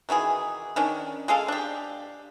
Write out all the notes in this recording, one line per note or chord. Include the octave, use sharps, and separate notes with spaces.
B2 D#3 E3 G#4
D#3 C#4 D4
G#3 G#4 A4 F5
D4 G4